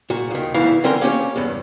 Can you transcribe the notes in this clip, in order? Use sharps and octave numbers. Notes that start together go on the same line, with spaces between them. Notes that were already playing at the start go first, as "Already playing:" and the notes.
A#2 F#4
D#2 D#3
D2 G#2 B2 E3 E4 F5
D3 E3 C4 C#4 A#4 C6
A#3 C#4 G4 C#5
E2 G2